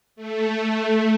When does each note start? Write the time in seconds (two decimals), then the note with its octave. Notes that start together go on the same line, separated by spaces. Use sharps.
0.16 A3